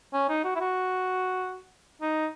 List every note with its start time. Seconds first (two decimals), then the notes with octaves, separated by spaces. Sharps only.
0.14 C#4
0.29 D#4
0.44 F#4
0.55 E4
0.60 F#4
2.02 D#4